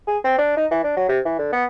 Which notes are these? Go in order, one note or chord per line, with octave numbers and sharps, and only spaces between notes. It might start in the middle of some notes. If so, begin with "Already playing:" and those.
G#4
C4
D4
D#4
E3
D4
F#3
C3
E3
D3
B3